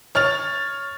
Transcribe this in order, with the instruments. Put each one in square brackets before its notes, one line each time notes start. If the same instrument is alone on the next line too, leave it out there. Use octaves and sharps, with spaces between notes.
[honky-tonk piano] C#5 F6 A6 F7